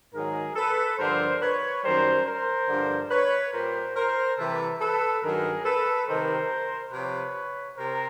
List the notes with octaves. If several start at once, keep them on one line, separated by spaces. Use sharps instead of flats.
G#2 D#3 F#3 G#4 A#4
A4 B4
G2 D3 F3 A#4 C5
B4 C#5
F#2 D#3 G3 A#4 C5
A#4 C5
G2 D3 F3
B4 C#5
A#2 G3 A#4 C5
A#4 C5
C3 E3 G3 A4 B4
A4 B4
G2 D#3 F#3 G#4 A#4
A4 B4
C3 D#3 G3 A#4 C5
C3 F3 B4 C#5
C3 A#4 C5